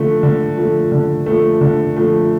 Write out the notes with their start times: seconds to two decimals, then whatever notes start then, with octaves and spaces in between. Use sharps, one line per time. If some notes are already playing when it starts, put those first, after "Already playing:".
Already playing: D3 F3 A3
0.23 D3
0.57 F3 A3
0.92 D3
1.26 F3 A3
1.61 D3
1.96 F3 A3